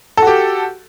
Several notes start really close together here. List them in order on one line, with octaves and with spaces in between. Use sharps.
A4 F#4 G4